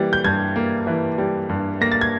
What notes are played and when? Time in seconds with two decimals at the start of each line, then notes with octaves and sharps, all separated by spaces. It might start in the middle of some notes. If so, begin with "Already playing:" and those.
Already playing: E3 G3 A#3
0.13 G6
0.24 G2 G#6
0.56 A#3
0.87 E3
1.18 G3
1.49 G2
1.81 A#3 A#6
1.92 A6
2.01 G#6